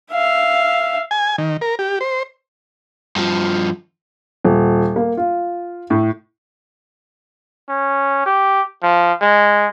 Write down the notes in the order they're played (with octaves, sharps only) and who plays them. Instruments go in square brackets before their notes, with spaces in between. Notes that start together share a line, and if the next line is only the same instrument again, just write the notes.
[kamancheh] E5 F5
[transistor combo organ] G#5
D#3
A#4
G4
C5
[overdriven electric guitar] G2 F3
[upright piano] D#1
A#3
F4
A2
[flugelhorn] C#4
G4
F3
G#3